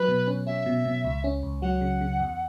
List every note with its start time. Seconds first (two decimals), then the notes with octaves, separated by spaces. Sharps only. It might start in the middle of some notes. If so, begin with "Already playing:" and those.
Already playing: F#3 B4
0.08 B2
0.28 C#4
0.46 C#4 E5
0.66 B2
0.85 B2
1.04 C#2
1.24 C#4
1.43 C#2
1.62 F#3 F#5
1.81 C#3
2.01 C#3
2.20 E2